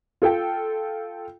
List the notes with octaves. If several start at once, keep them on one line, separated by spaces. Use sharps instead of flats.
F4 A4 G5